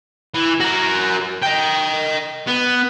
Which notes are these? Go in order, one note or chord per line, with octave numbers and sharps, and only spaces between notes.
E3
F#4 A#4
D#5 G5
B3